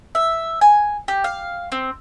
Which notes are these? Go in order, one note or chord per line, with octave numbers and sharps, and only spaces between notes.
E5
G#5
G4
F5
C4